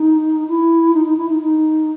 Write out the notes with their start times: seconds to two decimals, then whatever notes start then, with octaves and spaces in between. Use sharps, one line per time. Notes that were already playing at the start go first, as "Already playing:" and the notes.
Already playing: D#4
0.48 E4
0.94 D#4
1.05 D#4
1.17 E4
1.29 D#4
1.41 D#4